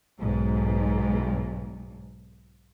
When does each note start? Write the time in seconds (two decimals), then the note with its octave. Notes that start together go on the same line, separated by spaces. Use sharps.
0.20 B1 G#2